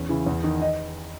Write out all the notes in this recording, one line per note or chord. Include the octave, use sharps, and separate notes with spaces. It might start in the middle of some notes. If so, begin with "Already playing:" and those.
Already playing: E2 C#4
C#3 E3
E2
D#3
D#4 D#5